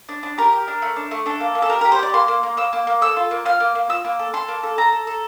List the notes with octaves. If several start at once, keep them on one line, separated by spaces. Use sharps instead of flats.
D4
D4
G4 A#4
G4
D4
A3
D4
A3
D4 A4
A#3
A#3
A4
G4 A#4
A#4
G4
C5
G4 D5
A#3 C6
A#3
A#3
A#3 E6
A#3
A#3
A4 E6
F4
A#3
F4 F6
A#3
A#3
F4 E6
A#3
A4
A4 C6
A#3
A4
A4 A#5
A4
A4